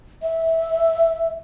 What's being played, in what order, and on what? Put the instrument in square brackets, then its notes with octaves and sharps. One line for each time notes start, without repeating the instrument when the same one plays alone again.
[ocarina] E5